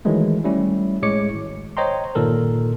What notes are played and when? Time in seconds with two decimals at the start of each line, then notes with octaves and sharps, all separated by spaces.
0.05 D#3 E3 F#3 G#3 A3
0.44 G3 A3 C#4 E4
1.02 A2 G#3 C#5 D6 C#7
1.34 G#1
1.77 C5 C#5 D#5 G5 A#5 C6
2.15 G1 A#2 D#3 A4 A#4